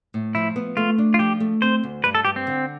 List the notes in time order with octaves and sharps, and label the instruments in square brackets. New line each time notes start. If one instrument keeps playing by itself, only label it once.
[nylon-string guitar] A2
[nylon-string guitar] F3 [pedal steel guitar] E4
[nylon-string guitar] B3
[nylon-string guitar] A3 [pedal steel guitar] F4
[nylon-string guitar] D4
[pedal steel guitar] F4
[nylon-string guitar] F3 [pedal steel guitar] G4
[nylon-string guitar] A3
[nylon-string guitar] C4 [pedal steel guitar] C5
[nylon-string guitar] D2
[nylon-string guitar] G2 [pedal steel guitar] B4
[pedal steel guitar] A4
[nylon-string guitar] G2 [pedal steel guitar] G4
[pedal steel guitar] C4
[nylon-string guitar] D3